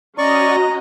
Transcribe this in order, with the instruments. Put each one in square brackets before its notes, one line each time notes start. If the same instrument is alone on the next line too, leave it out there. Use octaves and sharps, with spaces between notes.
[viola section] C#4 D#5 [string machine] F#4 [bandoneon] D5 C#6 [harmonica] A#5